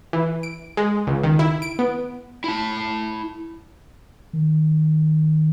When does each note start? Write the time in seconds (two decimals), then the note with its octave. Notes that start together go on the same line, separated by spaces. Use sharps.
0.13 E3
0.43 D7
0.77 G#3
1.07 C#2
1.24 D#3
1.39 E4
1.62 D7
1.79 B3
2.44 E4 A5
4.33 D#3